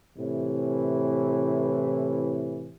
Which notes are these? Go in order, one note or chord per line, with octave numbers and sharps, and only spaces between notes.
A2 C3 E3